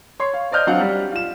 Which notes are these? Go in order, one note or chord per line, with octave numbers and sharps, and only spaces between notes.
C#5 C6
F5
C5 D5 D#5 F6 G6
F#3 C4 D4 F5 F#5
G3
F4 E7